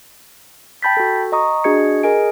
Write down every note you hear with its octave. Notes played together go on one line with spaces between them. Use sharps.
G5 A5 B5 G6 A6 B6
F#4 A4
D#5 A#5 C#6 D#6
D4 F#4 G#4 D#5 G#6 C#7
G#4 A#4 D#5 G#5 D7